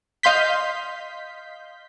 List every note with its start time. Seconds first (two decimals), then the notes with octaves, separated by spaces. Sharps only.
0.23 D#5 F5 C6 G6 B6